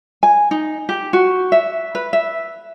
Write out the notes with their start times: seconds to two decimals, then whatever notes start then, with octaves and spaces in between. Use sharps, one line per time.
0.23 G#5
0.51 D#4
0.89 G4
1.13 F#4
1.52 E5
1.95 B4
2.13 E5